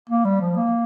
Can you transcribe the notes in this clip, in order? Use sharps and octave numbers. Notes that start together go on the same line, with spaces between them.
A#3
G3
F3
A#3